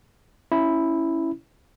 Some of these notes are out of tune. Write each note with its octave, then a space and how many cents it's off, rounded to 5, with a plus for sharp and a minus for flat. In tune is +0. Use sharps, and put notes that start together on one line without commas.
C#4 +0 E4 +0